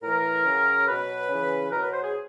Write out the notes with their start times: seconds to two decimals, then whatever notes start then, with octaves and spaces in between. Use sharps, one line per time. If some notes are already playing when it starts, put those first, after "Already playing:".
0.02 A2 E3 A#4
0.45 C#3 F#3
0.87 B2 F#3 B4
1.29 C#3 E3
1.71 B2 F#3 A#4
1.82 B4
1.92 C5
2.03 G#4